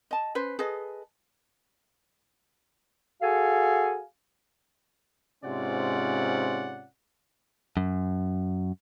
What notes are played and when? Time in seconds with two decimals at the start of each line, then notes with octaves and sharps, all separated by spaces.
0.11 D#5 A5
0.35 C#4 B4 C5
0.59 G#4 A4 B4 D#5
3.22 F#4 G#4 A4 F5 G#5
5.44 G#2 C3 C#4 F4 D5 F#5
7.77 F#2